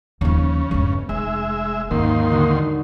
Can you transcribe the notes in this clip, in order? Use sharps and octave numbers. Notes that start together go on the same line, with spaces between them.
D#2 C#3 F3
G1 E2
F1 G#3 E5
D#2 G#2 D#3 A#3 C#4 C6
D3 D#4 F#4